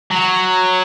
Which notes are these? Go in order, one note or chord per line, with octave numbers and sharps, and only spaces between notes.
F#3